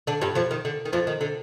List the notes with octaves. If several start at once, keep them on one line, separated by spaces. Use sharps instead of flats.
D3 D4
G2 G3
F2 F3
D#3
D3
D#3
F2 F3
D#3
D3